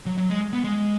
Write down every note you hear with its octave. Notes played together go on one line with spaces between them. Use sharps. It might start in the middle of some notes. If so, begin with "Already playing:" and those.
F#3
F#3
G#3
B3
G#3